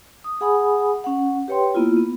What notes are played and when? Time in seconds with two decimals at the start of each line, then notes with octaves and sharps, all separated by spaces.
0.24 D#6
0.41 G#4 F#5 G#5 B5 D#6
1.04 C#4 F#5
1.48 G4 B4 C#5 G5 C6
1.74 A#3 B3 E4 F4
1.97 B3